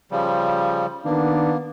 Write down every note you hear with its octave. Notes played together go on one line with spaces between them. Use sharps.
C#3 F3 G3
D#3 A#3 B3 D4